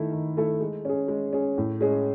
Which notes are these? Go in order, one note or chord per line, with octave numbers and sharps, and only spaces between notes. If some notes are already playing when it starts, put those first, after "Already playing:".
Already playing: D#3 A3 E4 A4
D#3
A3 E4 A4
G#3
C#4 G#4
G#3
C#4 G#4
A2
G#3 C#4 G#4